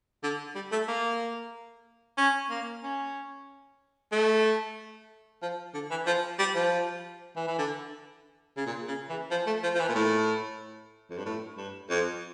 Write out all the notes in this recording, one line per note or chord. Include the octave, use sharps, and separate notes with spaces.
D3
G3
A3
A#3
C#4
A#3
C#4
A3
F3
D3
E3
F3
G3
F3
E3
E3
D3
C#3
A#2
C#3
E3
F3
A3
F3
F3
E3
A#2
A2
F2
G2
A2
G2
F2